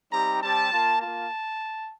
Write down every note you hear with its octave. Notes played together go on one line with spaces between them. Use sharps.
G3 C4 D#4 G4 A#5
G3 C4 G4 A5
A#3 F4
A#3 F4 A5